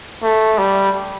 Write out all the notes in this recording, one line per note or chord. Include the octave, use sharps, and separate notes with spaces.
A3
G3